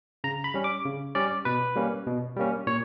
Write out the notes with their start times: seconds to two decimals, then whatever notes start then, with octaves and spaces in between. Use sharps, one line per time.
0.24 C#3 A#5
0.44 B5
0.54 G3 C#4
0.64 D6
0.85 C#3
1.15 G3 C#4 D5
1.45 B2 B4
1.76 G3 A#3 C#4
2.06 B2
2.37 G3 A#3 C#4
2.67 A#2 C#5